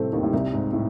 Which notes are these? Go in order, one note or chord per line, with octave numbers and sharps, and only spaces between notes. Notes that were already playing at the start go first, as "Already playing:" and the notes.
Already playing: A2 C3 A3 C4
D#2 D#3
A2
C2 C3
G#2
A2